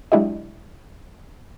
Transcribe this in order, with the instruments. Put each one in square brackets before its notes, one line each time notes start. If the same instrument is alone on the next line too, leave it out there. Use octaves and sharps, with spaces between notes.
[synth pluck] F#3 G#3 D4 E4 G4 D#5